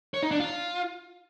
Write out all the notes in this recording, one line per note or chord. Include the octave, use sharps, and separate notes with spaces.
C#5
D#4
D4
F4